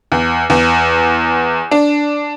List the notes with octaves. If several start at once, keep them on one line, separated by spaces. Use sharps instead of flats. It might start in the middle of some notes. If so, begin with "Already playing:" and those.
E2
E2
D4